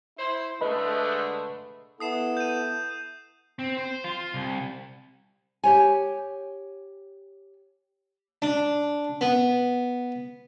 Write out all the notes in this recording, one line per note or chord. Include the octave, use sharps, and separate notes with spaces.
E4 C5
D3 G#3 A3 B4 D#5 B5
B3 E4 A4 D#6 C7 E7
G6 D#7
C4
C5
F4
C2
G4 C#5 G#5
D4
B3